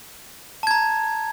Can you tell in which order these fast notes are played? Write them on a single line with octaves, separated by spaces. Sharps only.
A5 G#6 A#5